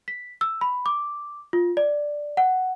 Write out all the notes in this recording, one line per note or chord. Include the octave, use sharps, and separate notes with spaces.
B6
E6
B5
D6
F4
D5
F#5